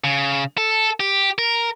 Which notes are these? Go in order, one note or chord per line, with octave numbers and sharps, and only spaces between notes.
C#3
A4
G4
A#4